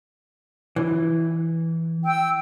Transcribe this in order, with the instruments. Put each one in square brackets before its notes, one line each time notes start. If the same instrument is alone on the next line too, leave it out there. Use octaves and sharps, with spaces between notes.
[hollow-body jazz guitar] E3
[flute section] G5 E6